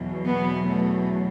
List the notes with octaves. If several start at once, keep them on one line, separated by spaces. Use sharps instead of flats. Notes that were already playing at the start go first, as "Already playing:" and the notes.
Already playing: E2 B2 F#3
B3
A3